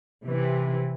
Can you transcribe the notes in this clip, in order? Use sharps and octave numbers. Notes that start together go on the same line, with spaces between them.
C3 E3